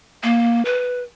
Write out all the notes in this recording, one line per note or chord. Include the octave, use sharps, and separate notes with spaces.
A#3
B4